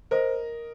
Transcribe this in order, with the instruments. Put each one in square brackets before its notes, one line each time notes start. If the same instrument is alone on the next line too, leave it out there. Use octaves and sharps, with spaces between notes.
[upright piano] A#4 D#5 [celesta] C5